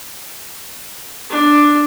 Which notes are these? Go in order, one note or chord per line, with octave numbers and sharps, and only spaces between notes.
D4